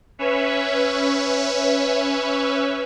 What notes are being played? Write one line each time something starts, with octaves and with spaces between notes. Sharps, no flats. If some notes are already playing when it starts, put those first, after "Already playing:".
C#4 B4 C#5 E5